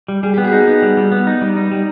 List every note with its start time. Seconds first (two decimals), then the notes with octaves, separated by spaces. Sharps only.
0.08 G3
0.23 G3 G#4
0.34 B3 G4
0.44 F#4 G#4
0.53 D#4
0.68 B3
0.82 G3
0.97 G3
1.12 B3
1.27 D#4
1.42 G3
1.57 D#4
1.72 G3